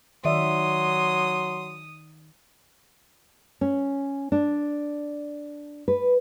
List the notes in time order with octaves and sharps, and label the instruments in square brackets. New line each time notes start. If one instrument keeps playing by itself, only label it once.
[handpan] D#3 D5 E5 [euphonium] F#3 [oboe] C6 [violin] D#6
[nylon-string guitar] C#4
D4
B4